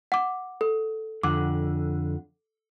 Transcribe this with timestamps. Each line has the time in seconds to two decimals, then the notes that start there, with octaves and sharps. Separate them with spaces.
0.12 F#5 D6
0.61 A4
1.23 F2 D3 F#5 D6